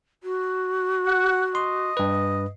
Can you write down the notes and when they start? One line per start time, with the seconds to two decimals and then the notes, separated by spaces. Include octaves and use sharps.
0.23 F#4
1.07 F#5
1.55 D#5 C6
1.97 G2 B4